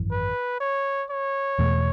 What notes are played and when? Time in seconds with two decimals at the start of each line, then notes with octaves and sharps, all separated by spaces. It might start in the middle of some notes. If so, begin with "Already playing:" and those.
Already playing: G#1 F#2 E3
0.11 B4
0.60 C#5
1.10 C#5
1.59 E2 B2 A3